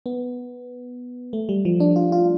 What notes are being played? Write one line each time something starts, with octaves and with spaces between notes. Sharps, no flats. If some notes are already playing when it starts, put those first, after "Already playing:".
B3
A3
G3
F3
D4
F4
F4